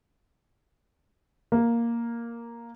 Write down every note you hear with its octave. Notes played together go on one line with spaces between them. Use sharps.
A#3